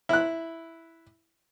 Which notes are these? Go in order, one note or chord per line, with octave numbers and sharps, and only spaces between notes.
E4 F#6